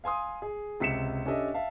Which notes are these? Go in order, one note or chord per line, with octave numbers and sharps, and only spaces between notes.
F5 G#5 C6 D#6
G#4
C#2 C3 B6 C#7 E7
C#4 D4 G4 A4 D#5 E5
E5 F5 A5